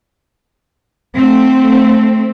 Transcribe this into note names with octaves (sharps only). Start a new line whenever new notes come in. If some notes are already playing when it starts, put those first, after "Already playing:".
A3 C4